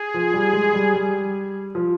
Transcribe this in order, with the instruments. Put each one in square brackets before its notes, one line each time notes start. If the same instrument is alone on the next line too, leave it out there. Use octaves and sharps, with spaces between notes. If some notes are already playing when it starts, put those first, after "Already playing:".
Already playing: [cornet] G#4
[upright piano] F3
G3
G#3
G3
G3
F3